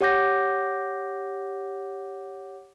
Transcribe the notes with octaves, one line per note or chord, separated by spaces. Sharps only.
G4 C#5 F#5 D6 G6 A#6